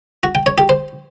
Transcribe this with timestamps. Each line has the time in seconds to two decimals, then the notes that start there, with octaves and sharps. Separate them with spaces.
0.23 F#4
0.35 G5
0.46 C#5
0.58 G4
0.69 C5